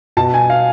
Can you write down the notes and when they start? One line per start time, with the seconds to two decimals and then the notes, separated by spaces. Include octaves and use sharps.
0.17 B2 A5
0.34 G#5
0.50 F5